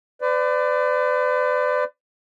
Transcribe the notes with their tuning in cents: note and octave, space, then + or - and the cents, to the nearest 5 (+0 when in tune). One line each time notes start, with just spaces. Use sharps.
B4 +40 D5 +10